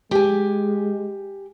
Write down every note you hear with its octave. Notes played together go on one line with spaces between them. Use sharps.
G#3 G4 G#5